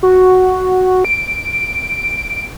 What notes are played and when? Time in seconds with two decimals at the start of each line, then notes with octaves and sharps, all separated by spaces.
0.03 F#4
1.05 D7